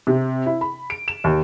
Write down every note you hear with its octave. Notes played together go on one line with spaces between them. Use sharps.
C3
E4
B5
D7
E7
D#2